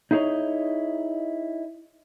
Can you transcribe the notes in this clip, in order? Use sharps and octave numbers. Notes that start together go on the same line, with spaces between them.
D#4 E4 G#4 C5 C#5 D#5